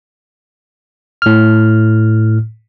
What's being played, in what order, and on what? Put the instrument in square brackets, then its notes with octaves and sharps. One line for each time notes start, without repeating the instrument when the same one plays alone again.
[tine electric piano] A2 F6